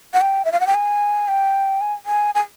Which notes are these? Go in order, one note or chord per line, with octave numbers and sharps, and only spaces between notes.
F#5
G5
E5
F5
F#5
G5
G#5
G5
G#5
G#5
G#5